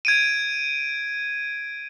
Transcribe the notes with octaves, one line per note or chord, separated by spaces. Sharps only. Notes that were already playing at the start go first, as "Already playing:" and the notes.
G#6 D7 D#7